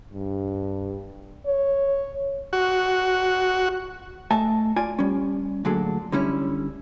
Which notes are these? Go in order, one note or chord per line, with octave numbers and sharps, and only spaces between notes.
G2
C#5
F#4
A3 D#5 E5 G#5 A5
F4 D5 G#5
G3 C#4
D2 A#2 F#3 D4 G#4 A4
D3 G3 C#4 E4